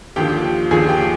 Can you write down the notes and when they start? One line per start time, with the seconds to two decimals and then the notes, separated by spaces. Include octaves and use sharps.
0.16 D#2 D3 F3 G4 G5
0.71 D#2 D3 F3 G#4 G#5
0.89 G4 G5